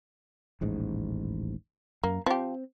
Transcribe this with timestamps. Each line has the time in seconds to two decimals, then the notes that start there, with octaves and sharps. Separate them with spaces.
0.61 D#1 A1 G#2
2.04 F#2 A#3
2.26 F3 C4 G4